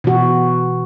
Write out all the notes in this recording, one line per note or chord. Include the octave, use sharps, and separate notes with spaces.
B2 E3 F#4